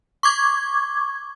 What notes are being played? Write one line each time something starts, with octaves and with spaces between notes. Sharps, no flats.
C#6 D6 G#6